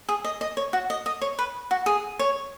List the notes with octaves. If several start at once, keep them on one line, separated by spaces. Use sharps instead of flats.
G#4
D#5
D#5
C#5
F#4
D#5
D#5
C#5
B4
F#4
G#4
C#5